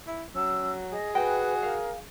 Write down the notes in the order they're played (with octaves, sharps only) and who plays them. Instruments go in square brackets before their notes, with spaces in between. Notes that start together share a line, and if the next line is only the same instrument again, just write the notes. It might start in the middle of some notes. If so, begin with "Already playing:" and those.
[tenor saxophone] E4
[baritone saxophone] F#3 [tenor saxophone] C#4 [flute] E6
[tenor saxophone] G#4 [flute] D#5
[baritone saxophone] F#4 [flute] B4 [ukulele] D#5 G5 G#5
[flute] A#4 [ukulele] F5